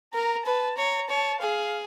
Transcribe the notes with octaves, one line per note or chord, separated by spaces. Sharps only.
A#4 A#5
B4 A5
C#5 A#5
C#5 A5
G#4 F5